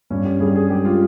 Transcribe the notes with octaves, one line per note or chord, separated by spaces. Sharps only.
G2 C#4
G4
G2 G#4
G#4
G#3 G4
F4